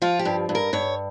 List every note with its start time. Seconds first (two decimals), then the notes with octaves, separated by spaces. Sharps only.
0.02 F3 F4
0.19 G4
0.25 G2
0.49 G2
0.55 A#4
0.73 G2 C#5